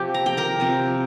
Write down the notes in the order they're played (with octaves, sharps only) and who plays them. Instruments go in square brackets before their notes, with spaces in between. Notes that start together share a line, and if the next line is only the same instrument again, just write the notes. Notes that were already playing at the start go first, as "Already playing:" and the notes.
Already playing: [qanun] C3 F3 C4 G4 G5
A#5
G5
A#4 A#5
C3 F3 C4